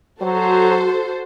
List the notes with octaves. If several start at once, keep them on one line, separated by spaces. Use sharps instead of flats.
F#3 F#4 A4 C5